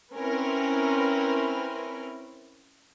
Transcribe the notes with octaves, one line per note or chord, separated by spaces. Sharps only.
C4 C#4 E4 A#4 B4